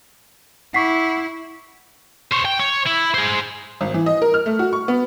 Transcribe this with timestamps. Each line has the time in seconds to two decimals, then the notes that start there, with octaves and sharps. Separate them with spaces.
0.74 E4 F#5 C#6 D6 B6 C7
2.32 C5 C#5
2.45 G5
2.59 C#5
2.86 E4
3.14 G#4 C5
3.81 G#1
3.94 E3
4.06 D#5
4.22 A#4
4.34 F6
4.46 A3
4.59 F#4
4.73 C#6
4.88 B3